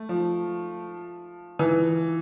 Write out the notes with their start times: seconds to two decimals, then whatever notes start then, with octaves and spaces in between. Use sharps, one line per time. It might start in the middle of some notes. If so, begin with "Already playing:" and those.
Already playing: A3
0.09 F3
1.59 E3